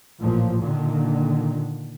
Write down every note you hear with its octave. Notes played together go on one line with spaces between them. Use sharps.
A1 A#2 F3
A#2 D3 D#3